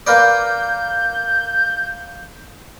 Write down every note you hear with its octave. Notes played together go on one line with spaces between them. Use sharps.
A#3 B4 D5 G6